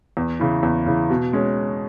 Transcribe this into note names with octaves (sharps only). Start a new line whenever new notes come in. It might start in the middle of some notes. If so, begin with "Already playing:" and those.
E2
C#3 E3
E2
C#3 E3
B2
G#3 C#4